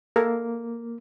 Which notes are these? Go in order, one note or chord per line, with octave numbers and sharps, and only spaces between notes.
A#3 A4 A#4